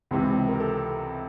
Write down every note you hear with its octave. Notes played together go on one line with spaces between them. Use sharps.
C#2 C3 E3
A#4
A4